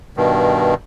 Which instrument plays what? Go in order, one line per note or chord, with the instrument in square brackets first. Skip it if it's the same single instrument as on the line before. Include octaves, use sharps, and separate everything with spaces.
[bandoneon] G2 B2 D#3